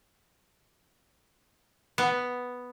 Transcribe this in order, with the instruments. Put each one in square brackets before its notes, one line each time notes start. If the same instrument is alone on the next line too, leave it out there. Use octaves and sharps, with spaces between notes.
[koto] B3